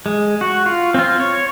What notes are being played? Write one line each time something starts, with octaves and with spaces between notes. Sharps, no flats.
G#3
F#4
F4
C4 F4
C#5